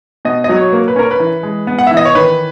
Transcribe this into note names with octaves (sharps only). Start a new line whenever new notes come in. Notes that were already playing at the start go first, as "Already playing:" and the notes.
B2 D#5
F#3 D#5
C#5
A#3
B4
C#4 A#4
B4
E3
G#3
B3
F#5
E3 E5
D#5
C#5
D#3 B4